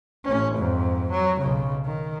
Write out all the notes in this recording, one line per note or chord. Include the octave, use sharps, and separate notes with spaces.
A1 C#4
F2 G#2
F#3
B1 C#3
D#3